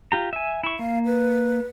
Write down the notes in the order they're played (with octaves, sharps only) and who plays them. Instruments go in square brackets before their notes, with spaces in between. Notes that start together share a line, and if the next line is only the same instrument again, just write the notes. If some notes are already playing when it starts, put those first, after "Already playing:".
[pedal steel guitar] F4 G4 A#5
E5 G#5
E4 C#6
[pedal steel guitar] A#3 [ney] F5
[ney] B4